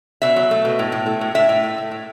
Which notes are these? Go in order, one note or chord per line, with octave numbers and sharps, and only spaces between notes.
B2 E5
F#3
A3
B2
A2
A2
A3
A2
A2 E5
A2
A3
A3
A2